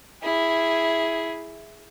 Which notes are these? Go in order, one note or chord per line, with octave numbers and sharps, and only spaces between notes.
E4 G#4